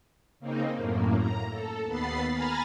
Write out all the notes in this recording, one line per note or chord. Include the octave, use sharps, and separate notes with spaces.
C#3 A#3 C4 D#4
F#2 A2 A#3
A#5
A4
D#2 B3 B5 A6 C7
G#5 A#5 B5 F6 A6